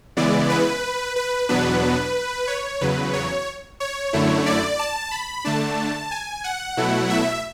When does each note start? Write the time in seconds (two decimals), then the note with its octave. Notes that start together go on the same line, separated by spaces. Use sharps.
0.17 C#3 E3 G#3 B3 E4 D5
0.50 B4
1.16 B4
1.49 E2 B2 F#3 B3 D4 B4
2.48 C#5
2.81 E2 C#3 F#3 B4
3.13 C#5
3.80 C#5
4.13 F#2 D3 A3 E4
4.46 D5
4.79 A5
5.11 B5
5.44 D3 A3 D4 A5
6.11 G#5
6.44 F#5
6.77 B2 F#3 A3 E4
7.10 E5